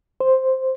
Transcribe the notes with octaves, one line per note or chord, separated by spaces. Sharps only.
C5